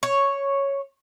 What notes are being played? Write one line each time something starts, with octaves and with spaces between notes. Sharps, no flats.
C#5